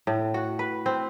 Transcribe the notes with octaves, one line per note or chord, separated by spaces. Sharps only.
A2
F#4
B4
C4